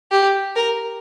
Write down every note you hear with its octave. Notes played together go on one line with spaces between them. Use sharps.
G4
A#4